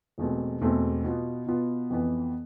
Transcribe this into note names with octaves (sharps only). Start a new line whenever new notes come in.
E1 E2 B2 A3 C4
E1 E2 B2 A3 C4
B2 B3 F4
B2 B3 F4
F2 E3 B3